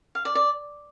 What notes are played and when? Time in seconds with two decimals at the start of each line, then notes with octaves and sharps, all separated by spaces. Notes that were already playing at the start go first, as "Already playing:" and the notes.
0.15 F5
0.25 D5
0.35 D5